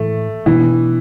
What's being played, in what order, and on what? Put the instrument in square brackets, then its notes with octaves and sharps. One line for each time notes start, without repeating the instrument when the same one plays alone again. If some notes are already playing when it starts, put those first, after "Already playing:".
Already playing: [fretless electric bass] A2 E3 [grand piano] A3
[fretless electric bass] B2 B3 D4 [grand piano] E3